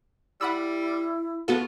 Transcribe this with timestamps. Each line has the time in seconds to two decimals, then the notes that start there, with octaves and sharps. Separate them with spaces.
0.41 G3 E4 F#5 B5 E6
1.48 B3 F4 F#4 A4